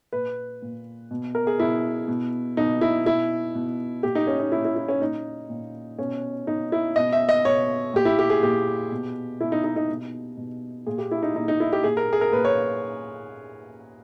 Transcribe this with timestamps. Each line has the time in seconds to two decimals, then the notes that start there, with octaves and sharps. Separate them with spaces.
0.13 A#2 B4
0.62 A#2
1.11 B2
1.35 A#4
1.47 G#4
1.60 B2 E4
2.08 B2
2.57 B2 D#4
2.81 E4
3.05 B2 E4
3.55 B2
4.03 A#2 G4
4.15 D#4
4.27 C#4
4.39 D#4
4.52 A#2 E4
4.65 E4
4.76 E4
4.89 C#4
5.02 A#2 D#4
5.50 A#2
5.98 B2 C#4
6.47 B2 D#4
6.72 E4
6.96 B2 D#5
7.13 E5
7.29 D#5
7.45 B2 C#5
7.94 A#2 G4
8.05 E4
8.19 G4
8.30 G#4
8.43 A#2 G4
8.92 B2
9.41 B2 E4
9.52 D#4
9.64 D#4
9.76 D#4
9.89 B2
10.37 B2
10.86 A#2 G#4
10.98 G4
11.11 E4
11.23 D#4
11.35 A#2 D#4
11.48 D#4
11.60 E4
11.73 G4
11.84 A#2 G#4
11.97 A#4
12.13 G#4
12.21 A#4
12.33 A#2 B4
12.45 C#5